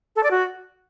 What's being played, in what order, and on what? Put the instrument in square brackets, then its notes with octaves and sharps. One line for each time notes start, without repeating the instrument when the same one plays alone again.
[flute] A4
D5
F#4